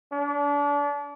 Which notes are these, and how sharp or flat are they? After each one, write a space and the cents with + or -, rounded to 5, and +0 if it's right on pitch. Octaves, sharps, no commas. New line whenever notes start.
D4 -35